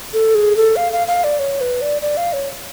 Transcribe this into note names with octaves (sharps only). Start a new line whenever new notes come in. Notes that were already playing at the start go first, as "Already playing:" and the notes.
A4
G#4
A4
F5
F5
F5
D5
C#5
B4
D5
D5
F5
C#5